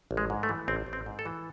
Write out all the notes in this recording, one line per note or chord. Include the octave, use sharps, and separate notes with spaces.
A1
G#3
G#2
A3
E3
A1 C4
A1
C4
G#2
A4
E3